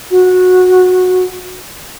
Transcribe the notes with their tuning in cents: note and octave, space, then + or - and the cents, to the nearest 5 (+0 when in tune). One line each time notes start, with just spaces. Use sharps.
F#4 -15